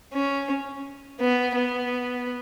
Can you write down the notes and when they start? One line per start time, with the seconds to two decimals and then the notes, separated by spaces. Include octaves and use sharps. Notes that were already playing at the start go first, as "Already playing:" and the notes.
0.13 C#4
1.20 B3
1.55 B3